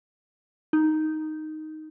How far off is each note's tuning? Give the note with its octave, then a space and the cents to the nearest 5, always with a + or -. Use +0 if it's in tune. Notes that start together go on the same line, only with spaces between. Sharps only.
D#4 +0